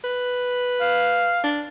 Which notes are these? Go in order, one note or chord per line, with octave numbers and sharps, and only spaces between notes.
B4
F5
D4